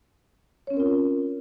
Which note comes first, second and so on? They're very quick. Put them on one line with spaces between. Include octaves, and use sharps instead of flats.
C#5 C#4 C4 A#4 F4